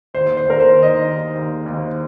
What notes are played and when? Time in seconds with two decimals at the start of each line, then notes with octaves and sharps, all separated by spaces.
0.14 D#2 C5
0.37 C5
0.45 D#2 A#4
0.60 C5
0.75 D#3
0.83 D#5
1.06 D#2
1.35 D#2
1.66 D#2